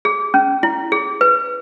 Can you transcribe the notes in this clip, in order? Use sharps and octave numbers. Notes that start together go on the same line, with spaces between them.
G#4
C#4
E4
G#4
B4